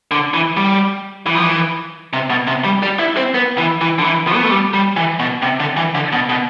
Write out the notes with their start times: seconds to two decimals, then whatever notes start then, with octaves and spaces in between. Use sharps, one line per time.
0.11 D3
0.34 E3
0.57 G3
1.26 E3
1.35 F3
1.43 E3
2.13 C3
2.30 B2
2.47 C3
2.64 G3
2.83 G3
2.99 E4
3.17 C4
3.34 B3
3.58 E3
3.81 E3
3.99 D3
4.04 E3
4.27 F3
4.35 B3
4.43 A3
4.51 G3
4.74 G3
4.96 E3
5.19 B2
5.42 C3
5.60 D3
5.77 E3
5.95 D3
6.12 B2
6.29 B2